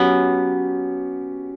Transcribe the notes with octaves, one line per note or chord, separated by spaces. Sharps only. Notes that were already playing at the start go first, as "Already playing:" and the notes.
Already playing: F#3 B3 C#4 G4